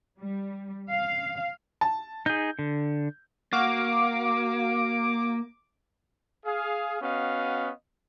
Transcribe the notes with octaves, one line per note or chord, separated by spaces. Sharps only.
G3
F5
A5
D#4 G#4 G6
D3
A#3 F#4 F5 D6
G#4 F5
B3 C#4 F#4 D#5 F5